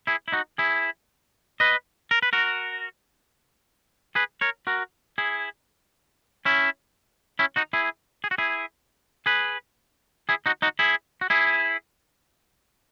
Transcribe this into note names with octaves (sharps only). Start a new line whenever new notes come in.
E4 G#4
E4
D#4 F#4
E4 G#4
B4 D#5
A#4
B4
F#4 A#4
G#4 B4
A#4 C#5
F#4 A#4
E4 G#4
C#4 E4
C#4 E4
D#4 F#4
E4 G#4
G#4
F#4
E4 G#4
G#4 B4
E4 G#4
D#4 F#4
D#4 F#4
E4 G#4
F#4
E4 G#4